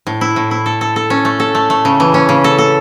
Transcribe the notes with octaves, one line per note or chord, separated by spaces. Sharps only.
A2
E4
A2
E4
A4
A4
A4
C#4
A3
A4
A3
A3
C#3
E3
C#4
C#3
A4
A4